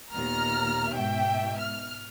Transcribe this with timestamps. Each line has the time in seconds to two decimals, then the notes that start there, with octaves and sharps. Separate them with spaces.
0.12 D#2 A#2 B3 A#5 F6
0.91 G#2 B2 E5 G5
1.58 F6